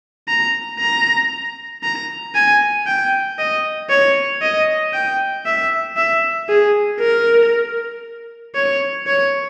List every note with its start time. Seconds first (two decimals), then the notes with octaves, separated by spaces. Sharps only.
0.28 A#5
0.80 A#5
1.83 A#5
2.35 G#5
2.87 G5
3.39 D#5
3.90 C#5
4.42 D#5
4.93 G5
5.46 E5
5.97 E5
6.49 G#4
7.01 A#4
8.55 C#5
9.07 C#5